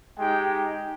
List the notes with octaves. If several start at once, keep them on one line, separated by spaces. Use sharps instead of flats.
G#3 D#4 G4 G5